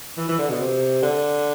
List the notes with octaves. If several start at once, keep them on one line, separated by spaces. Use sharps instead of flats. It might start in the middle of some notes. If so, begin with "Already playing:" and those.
E3
E3
D3
B2
C3
D3